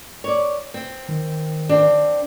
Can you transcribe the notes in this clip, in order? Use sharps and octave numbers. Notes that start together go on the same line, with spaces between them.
C#5 D5
C4
D#3
C4 D4